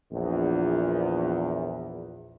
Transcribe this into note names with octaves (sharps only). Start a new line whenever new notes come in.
A#1 E2